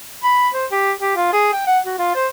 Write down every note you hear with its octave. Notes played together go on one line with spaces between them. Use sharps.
B5
C5
G4
G4
F4
G#4
G5
F#5
F#4
F4
C5